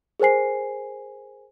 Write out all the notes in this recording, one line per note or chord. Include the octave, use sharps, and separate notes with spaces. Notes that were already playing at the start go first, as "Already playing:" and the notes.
G#4 A#4 C5 G#5 C7